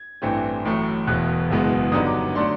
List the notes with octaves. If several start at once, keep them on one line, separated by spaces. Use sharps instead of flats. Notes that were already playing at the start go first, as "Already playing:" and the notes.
Already playing: G#6
A1 G2 E3 A3 C4
A1 A2 F#3 A3
E1 E2 B2 F#6
F#1 E2 B2 G#3 B3
G2 D3 F#3 B3 D#4 D#6
D6
D3 F#3 A3 D4 C6